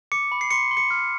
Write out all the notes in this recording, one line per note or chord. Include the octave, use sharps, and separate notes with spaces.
D6 C#7
B5
C7
C6 C#7
C6
C#7
F6